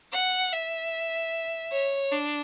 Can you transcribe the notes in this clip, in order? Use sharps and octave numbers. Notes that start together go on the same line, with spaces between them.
F#5
E5
C#5
D4